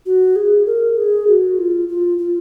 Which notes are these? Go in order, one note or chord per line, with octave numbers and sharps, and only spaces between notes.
F#4
G#4
A#4
G#4
F#4
F4
F4
F4